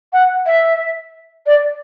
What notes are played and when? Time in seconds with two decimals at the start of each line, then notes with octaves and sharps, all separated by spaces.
0.13 F#5
0.46 E5
1.46 D5